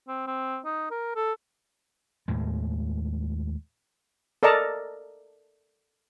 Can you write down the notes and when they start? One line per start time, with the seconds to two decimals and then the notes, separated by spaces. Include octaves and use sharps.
0.08 C4
0.27 C4
0.65 D#4
0.91 A#4
1.16 A4
2.28 D#2 A2 G#3
4.43 A4 A#4 D5 D#5 A5 A#5